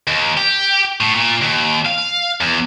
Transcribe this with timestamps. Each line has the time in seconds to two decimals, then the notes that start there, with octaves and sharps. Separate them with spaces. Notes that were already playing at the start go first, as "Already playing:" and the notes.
0.07 D#2
0.37 G4
1.01 A2
1.15 A#2
1.42 D#2
1.86 F5
2.41 E2